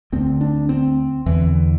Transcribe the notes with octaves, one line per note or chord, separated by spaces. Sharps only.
D2 D3 C4
D4
C4
E2 D3 E3